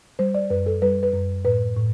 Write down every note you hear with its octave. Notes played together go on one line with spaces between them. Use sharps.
G3 C5
D5
F#2 B4
A4
G3 B4
B4
F#2
A2 B4
A2